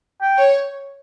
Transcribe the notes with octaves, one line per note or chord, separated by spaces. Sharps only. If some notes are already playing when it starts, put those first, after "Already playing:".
G5
C#5